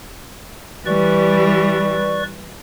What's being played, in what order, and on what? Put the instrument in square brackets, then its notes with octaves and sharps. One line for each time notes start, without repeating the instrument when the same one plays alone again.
[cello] E3 G3 [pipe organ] B4 D5 C#6